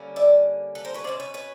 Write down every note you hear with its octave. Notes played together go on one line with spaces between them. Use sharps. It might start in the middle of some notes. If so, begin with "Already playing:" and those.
Already playing: D3 G3 A#3 C#4
D5 E5
A4 B4
A#4 C5
B4 C#5
B2 G#3 C#4 C5 D5
B4 C#5
B4 C#5